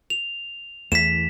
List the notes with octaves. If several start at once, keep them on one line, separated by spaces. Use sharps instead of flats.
F7
E2 E3 A3 B6 E7